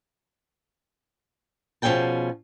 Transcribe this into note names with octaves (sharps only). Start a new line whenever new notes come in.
B2 F3 C#4 G#4 G5 A5